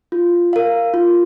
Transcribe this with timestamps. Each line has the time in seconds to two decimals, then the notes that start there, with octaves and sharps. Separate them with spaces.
0.12 F4
0.53 A#4 F5
0.94 F4